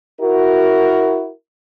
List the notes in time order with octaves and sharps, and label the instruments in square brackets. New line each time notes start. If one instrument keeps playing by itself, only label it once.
[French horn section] E4 F#4 A#4